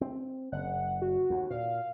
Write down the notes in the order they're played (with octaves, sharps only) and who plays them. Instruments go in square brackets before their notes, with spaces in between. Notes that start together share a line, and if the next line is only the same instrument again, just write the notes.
[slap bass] C4
[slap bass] F#1 [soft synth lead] F#5
[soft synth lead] F#4
[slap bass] D#2
[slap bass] A#2 [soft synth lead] F5